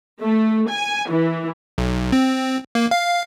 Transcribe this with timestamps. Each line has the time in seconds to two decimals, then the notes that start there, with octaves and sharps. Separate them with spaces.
0.22 A3
0.69 G#5
1.10 E3
1.78 B1
2.12 C4
2.75 A#3
2.91 F5